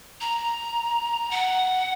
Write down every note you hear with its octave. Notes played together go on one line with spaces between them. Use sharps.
A#5
F#5